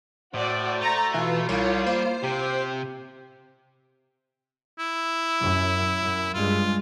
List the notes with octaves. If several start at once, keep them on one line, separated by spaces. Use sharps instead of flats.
A2 F#4 C5 D5
A3 A#5 A6
B2 E3 F4
C2 G3 C#5
A#3 C5
C3 G4
E4
F#2
F#2
G2 G#3 F4